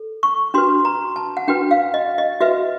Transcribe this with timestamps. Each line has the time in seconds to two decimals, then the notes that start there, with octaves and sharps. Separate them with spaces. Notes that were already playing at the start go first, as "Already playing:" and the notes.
Already playing: A4
0.23 C#6
0.54 D4 F#4 B4 C6
0.85 A#5
1.16 A5
1.37 F#5
1.48 D4 F#4 B4 G5
1.71 F5
1.94 D#5
2.18 D#5
2.41 F#4 B4 E5